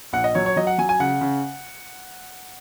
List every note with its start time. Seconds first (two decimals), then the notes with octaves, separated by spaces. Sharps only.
0.13 A#1 F#5
0.24 D#5
0.35 F#3 C#5
0.46 C#5
0.57 F#3 D#5
0.67 F#5
0.78 F#3 G#5
0.89 G#5
1.00 C#3 F#5
1.21 C#3